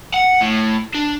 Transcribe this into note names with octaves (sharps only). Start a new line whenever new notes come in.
F#5
A2
D4